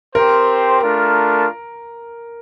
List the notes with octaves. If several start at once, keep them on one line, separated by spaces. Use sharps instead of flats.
C4 G4 A#4 C5
A3 D4 F4 A#4